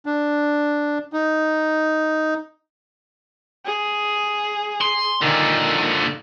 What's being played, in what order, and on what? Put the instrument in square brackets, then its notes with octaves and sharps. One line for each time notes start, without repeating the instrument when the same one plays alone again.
[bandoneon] D4
D#4
[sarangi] G#4
[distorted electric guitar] C6
[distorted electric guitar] A#2 D3 [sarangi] D#3